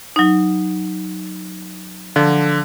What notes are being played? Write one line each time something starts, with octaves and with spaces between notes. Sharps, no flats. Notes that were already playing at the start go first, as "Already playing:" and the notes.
F#3 D#4
D3 F3